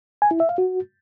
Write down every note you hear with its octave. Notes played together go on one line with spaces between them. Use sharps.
G#5
E4
E5
F5
F#4